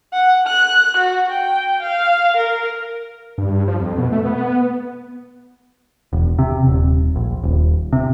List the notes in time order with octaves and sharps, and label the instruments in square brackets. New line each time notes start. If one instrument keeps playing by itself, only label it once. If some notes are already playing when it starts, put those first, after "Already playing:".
[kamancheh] F#5
F#6
F#4
G5
F5
A#4
[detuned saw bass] G2
F3
F2
B2
A3
B3
[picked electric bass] E1
C3
D#1
A#1
D#1
C3